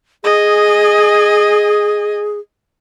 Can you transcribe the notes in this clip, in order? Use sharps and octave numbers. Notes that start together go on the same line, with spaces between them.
G#4 D#5 G#5